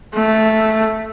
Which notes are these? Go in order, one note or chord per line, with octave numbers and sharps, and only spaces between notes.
A3